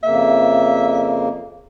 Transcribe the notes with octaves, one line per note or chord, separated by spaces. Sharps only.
F2 C#3 A#3 E5